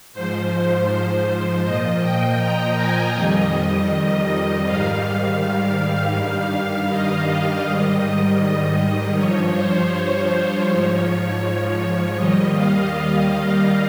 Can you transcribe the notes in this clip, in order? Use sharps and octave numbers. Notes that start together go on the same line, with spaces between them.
G#2 F3 C5
A#2 F3 D#5
G5
A#5
G#5
F2 D#3 G3 D#5
G#2 D#3 G3 F5
F5
G2 D#3 G3
D#5
D#5
G#2 D#3 G3 D#5
G2 F3 C#5
C5
C#5
G#2 F3
D#2 D#3 G3 D#5
F5
F5